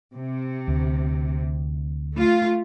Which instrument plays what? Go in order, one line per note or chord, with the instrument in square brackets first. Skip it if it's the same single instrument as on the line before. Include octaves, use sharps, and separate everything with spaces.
[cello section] C3
[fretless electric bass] D2
[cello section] A3 F4